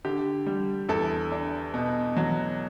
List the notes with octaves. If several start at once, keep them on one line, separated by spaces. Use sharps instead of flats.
D3 G4
G3
E2 A4
D4
B2
F#3